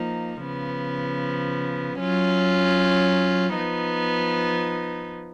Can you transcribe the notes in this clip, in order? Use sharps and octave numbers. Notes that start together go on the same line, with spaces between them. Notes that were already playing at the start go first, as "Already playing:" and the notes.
Already playing: F3 A#3 D#4
C#3 F3 B3
F#3 C#4 F4
F3 B3 D#4